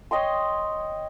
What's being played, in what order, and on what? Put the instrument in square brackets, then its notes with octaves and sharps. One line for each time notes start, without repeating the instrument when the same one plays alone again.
[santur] C#5 D#5 G5 C6